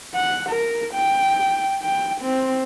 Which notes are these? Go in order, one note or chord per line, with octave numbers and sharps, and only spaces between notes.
F#5
A#4
G5
G5
C4